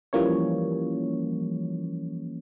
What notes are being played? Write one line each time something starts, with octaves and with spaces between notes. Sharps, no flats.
E3 F3 G3 A#3 C#4 C#5